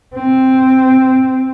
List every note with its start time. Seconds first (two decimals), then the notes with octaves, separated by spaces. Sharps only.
0.15 C4